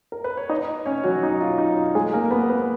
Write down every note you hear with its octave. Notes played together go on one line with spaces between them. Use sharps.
A#4
B4
C#5
D#4 D#5
C#4 C#5
F#3 F#4
D#4
F4
D#4
F4
G#3 G#4
A#3 A#4
B3 B4
B3 B4